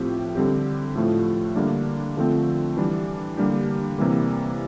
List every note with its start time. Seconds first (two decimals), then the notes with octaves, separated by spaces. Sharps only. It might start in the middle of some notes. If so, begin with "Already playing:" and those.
Already playing: A2 F3 C4 G4
0.35 D3 G3 C4 G4
0.96 A2 F3 A3
1.56 D3 G3 A#3 D4
2.17 D3 F3 A3 C4
2.77 E3 G3 D4
3.37 D3 G3 A#3 D4 G4
3.98 C3 E3 G3 A#3